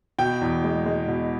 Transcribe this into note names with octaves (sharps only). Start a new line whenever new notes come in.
B2 G5
E2
G#3
G#3
B2